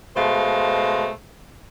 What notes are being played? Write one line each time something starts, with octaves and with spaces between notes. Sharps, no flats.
B2 G#3 A3 C5 F5